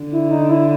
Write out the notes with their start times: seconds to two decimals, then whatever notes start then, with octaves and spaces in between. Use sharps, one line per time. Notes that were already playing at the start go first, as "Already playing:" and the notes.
Already playing: D3
0.12 E4
0.31 D#4
0.49 E4